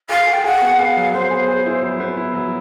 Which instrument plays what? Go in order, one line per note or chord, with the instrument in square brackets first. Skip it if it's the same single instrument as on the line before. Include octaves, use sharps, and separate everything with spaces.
[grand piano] G#4 [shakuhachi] F5
[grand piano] G#4
[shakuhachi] G5
[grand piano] G#4 [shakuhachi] F#5
[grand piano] B3
[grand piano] G#4 [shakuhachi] F5
[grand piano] F#3
[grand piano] B3 [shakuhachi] C5
[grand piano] G#4
G#4
E4
F#3
B3
E4
F#3